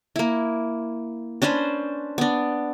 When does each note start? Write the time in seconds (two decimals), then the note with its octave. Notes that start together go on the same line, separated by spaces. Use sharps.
0.16 A#3 E4
1.42 C#4 D4 B4 C5
2.18 B3 D4